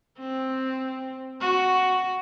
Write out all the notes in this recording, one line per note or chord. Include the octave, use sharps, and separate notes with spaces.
C4
F#4